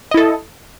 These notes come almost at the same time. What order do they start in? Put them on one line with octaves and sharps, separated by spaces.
D#5 E4 A4